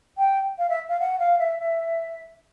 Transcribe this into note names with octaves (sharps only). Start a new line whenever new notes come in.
G5
F5
E5
F5
F#5
F5
E5
E5